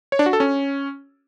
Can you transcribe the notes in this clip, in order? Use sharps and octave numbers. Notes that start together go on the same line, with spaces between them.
C#5
D4
F#4
A4
C#4